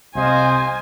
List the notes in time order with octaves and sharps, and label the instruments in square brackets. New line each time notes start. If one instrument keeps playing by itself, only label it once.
[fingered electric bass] C2 C3 [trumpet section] C5 D#5 F5 [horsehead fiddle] G#5